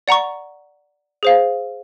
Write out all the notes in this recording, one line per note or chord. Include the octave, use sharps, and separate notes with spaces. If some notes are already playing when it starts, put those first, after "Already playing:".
D5 F#5 A#5 C#6
G#4 C5 F5